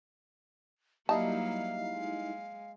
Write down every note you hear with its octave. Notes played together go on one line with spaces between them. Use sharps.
F#3 G3 A#3 D#4 E4 F5 A5
G#3